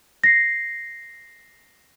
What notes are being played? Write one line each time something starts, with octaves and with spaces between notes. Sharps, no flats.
A#6 C7